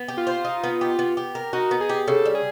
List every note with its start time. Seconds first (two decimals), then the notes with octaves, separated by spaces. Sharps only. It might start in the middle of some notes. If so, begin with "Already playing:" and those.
Already playing: B3
0.08 G4
0.17 F4
0.27 C5
0.44 D#4
0.64 B3
0.81 G4
0.99 B3
1.17 G4
1.35 A#4
1.53 D#4 F#4
1.71 B3
1.81 G#4
1.89 G4
2.08 C#3 A4
2.25 G3
2.35 G#4